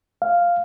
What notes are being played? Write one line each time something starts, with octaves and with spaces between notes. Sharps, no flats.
F5